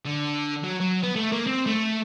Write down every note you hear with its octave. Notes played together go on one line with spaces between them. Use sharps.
D3
F#3
F#3
B3
A3
A#3
C4
A3